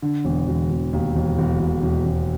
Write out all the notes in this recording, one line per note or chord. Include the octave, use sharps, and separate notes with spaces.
D3
E1
E1
E1
D#2
E1
E1
E1
E1
E1